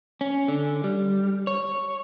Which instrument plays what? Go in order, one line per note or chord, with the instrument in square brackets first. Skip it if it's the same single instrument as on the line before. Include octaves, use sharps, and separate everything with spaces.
[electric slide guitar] C#4
D3
G3
C#5